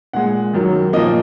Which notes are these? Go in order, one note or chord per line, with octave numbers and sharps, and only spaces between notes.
A#2 G#3 F#5
F#2 D#3 F#3
A#2 F3 A#3 D#5